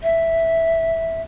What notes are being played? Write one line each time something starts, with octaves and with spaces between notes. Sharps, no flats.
E5